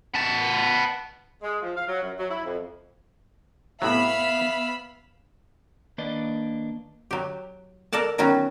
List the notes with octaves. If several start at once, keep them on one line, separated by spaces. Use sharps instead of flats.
B3 A5
G#3
F3
F5
F#3
F#2
F#3
E4
F2
A2 C3 F#3 B3 E5 F5 B5 E6
D#3 A#3 D4 B4 D5 D#5
F#3 G4
A4 A#4 D5 F#5 A5
D#3 F#3 B3 C#4 F#4